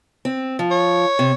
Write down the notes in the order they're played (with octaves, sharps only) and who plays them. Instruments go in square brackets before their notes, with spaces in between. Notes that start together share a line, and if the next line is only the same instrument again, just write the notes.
[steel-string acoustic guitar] C4
F3
[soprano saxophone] C#5
[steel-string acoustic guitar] C3